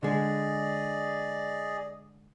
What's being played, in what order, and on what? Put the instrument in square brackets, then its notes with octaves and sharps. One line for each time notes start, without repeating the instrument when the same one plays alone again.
[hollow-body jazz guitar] D3 G#3 [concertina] G#4 D5 D#5